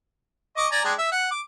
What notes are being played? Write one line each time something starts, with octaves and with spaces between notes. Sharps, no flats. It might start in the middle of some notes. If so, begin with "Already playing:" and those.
D#5 C#6 D6
D5 G#5 A#5
G#3 D4 G4
E5
F#5
D6